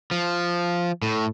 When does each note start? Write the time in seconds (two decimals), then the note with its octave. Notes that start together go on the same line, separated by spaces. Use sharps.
0.11 F3
1.02 A2